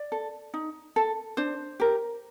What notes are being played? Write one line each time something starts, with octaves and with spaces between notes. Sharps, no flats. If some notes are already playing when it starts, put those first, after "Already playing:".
Already playing: D5
A4
D#4
A4
D4 C5
G4 A#4